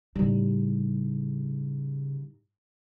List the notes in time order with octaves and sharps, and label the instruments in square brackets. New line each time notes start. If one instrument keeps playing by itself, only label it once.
[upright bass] A2 D#4 [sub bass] C#3 [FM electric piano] G3